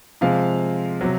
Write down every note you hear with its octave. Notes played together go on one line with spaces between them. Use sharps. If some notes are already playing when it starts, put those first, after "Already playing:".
C3 F3 G#3 F5
C3 F#3